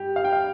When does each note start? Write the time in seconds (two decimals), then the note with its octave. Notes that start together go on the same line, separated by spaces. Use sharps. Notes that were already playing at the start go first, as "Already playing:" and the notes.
Already playing: G2 G4
0.16 F5
0.24 G5
0.33 F5